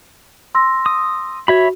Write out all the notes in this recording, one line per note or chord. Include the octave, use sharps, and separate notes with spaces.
C6 E6 A#6
D#6
F#4 C#5 E5 B5